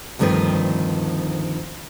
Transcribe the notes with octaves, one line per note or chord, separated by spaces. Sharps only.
D2 G2 D#3 F3 C4 B4